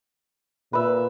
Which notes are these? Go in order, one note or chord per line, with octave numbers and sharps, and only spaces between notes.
A#2 B4 E5